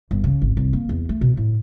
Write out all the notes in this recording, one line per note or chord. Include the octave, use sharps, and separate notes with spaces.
G1
C#3
G#1
C2
A#3
E2
A3
B2
A2